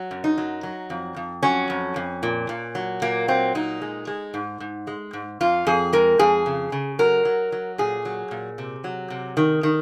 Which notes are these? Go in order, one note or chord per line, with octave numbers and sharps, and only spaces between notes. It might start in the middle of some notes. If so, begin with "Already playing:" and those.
Already playing: F#3
F#2
D#4
F#3
F#3
F2
F2
F#3 C#4
F2
F2
A#2
A#2
F#3
A#2 A#3
F#3 C4
A#2 D#4
G#3
G#3
G#2
G#2
G#3
G#2
F2 F4
F2 G#4
G#3 A#4
F2 G#4
C#3
C#3
F#3 A#4
F#3
F#3
A#2 G#4
F#3
A#2
C3
F#3
C3
D#3
D#3